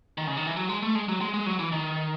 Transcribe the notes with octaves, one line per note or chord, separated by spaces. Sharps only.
D#3
C#3
D#3
E3
F#3
G#3
A3
G#3
F#3
G#3
G#3
F#3
E3
D#3